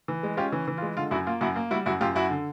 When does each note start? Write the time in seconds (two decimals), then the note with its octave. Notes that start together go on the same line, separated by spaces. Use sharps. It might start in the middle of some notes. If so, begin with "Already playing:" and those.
0.08 E3
0.23 G#3
0.37 C#4 F4 G4
0.52 E3
0.68 E3
0.78 F4
0.82 G#3
0.97 D3 F4
1.11 F#2 E4 F#4
1.27 A#3 F4
1.41 F#2 E4 F#4
1.56 A#3
1.71 G3 E4 F#4
1.86 F#2 E4 F#4
2.01 F#2 F4 G4
2.15 F#2 E4 F#4
2.30 D3